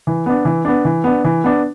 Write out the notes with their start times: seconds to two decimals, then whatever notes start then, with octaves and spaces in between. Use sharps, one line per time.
0.07 E3
0.26 B3 D4
0.45 E3
0.65 B3 D4
0.85 E3
1.04 B3 D4
1.24 E3
1.44 B3 D4